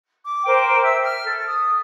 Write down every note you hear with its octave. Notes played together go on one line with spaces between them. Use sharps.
D6
A#4 C5 G5 D6
E5 E6
F6
A4
D#6